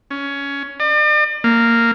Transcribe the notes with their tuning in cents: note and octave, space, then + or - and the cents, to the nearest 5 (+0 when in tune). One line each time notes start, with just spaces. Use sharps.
C#4 +15
D5 +40
A#3 -10